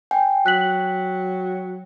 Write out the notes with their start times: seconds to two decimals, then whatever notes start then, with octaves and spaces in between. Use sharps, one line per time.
0.11 G5 G#5
0.46 F#3 F#6 B6 F#7